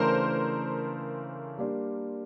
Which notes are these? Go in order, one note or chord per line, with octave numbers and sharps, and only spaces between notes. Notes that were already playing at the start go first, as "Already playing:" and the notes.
Already playing: C#3 E3 A3 D4 A#4 C5
G3 A#3 D4